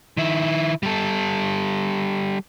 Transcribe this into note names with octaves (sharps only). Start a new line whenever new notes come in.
D#3 E4
G3 A4